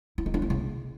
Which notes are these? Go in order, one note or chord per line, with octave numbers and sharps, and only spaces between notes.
E4
D#4
D4
A#3
C#3